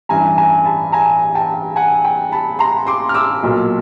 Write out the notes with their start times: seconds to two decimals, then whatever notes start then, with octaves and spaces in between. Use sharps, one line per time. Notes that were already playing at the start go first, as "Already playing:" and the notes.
0.09 A1 G2 E3 G#5 A#5
0.37 G#5 A#5
0.65 A5 B5
0.92 G#5 A#5
1.35 G5 A5
1.76 F#5 G#5
2.05 G5
2.32 A5 B5
2.59 A#5 C6
2.87 C6 D6
3.09 F6
3.14 D6 E6
3.43 B1 A#2 F#3